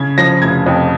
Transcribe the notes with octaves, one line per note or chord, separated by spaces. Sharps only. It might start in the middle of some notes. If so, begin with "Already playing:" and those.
Already playing: C#3 G#6
F3 A#6
F1 G#6
F2